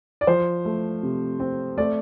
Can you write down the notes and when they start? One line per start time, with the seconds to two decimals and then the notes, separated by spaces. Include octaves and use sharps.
0.21 D5
0.27 F3 C5
0.65 A3
1.03 C3
1.40 C4
1.77 A3 D5